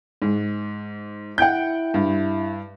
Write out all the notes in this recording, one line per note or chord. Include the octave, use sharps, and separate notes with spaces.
G#2
E4 F#5 G5 G6
G2